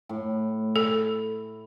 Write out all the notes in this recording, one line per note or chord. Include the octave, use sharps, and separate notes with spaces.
A2
A4